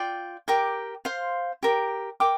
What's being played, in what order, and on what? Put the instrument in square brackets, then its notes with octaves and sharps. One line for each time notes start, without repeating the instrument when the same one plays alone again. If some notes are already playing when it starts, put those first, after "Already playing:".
Already playing: [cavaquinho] F4 D5 G5
G4 A#4 G5 D6
C5 F5 C6
G4 A#4 G5
A#4 G5 D6